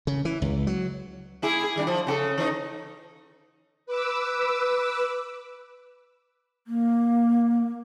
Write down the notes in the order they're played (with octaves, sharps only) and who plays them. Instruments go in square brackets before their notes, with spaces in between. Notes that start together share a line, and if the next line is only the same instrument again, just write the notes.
[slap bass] C#3
E3
C#2
F#3
[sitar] A#3 E4 G#4
G#4
D#3 G3 D4
F3
C#3 F#4 A4
E3 D#4
[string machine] B4 D6 E6
[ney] A#3